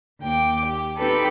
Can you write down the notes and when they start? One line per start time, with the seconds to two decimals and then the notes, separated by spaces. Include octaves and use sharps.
0.21 D#2 G5 D6
0.65 G4
0.96 C4 D#4 G4 A4 B4